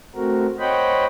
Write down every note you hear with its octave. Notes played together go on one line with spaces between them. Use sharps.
A3 C4 F#4 A#4
C5 C#5 D#5 F#5 G5 B5